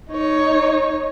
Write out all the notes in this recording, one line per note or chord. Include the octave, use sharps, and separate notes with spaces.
D#4 C#5